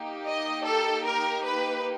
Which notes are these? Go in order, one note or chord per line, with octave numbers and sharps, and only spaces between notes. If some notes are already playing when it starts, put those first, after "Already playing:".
Already playing: A#3 D#4 G4
D#5
A4
A#4
B4